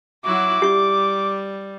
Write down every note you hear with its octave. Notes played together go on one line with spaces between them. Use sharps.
F#3 E4 F#4 D6
G3 G4 C#6